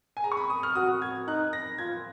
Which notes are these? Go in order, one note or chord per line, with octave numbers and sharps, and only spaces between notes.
G#5
G#4 A#5
C#6
B5
D#6
F6
F#4 D#6
G#6
D#4 F#6
A#6
F4 G#6